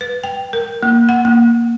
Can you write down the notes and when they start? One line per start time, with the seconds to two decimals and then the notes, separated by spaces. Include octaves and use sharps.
0.01 B4
0.24 G5
0.53 A#4
0.83 A#3
1.09 F#5
1.25 A#3